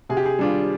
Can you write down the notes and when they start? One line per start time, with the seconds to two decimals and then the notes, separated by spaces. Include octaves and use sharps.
0.09 C3 G#4
0.17 G4
0.25 G#4
0.39 G3 D4 F4